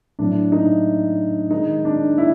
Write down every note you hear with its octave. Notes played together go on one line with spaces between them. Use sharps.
A2 F#3 A3 D4
D#4
D#3 G#3 D#4
D4
E4